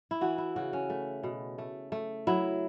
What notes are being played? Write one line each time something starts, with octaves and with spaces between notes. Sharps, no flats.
E4
E3 F#4
E4
C#3 F#4
C#4
A3
B2
A3
A3
F#3 E4